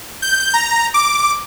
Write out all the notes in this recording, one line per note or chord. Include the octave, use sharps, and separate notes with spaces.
G6
A#5
D6